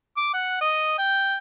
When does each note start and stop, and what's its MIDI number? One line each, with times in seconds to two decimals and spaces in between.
0.17 0.30 86
0.34 0.60 78
0.61 0.97 75
0.99 1.37 79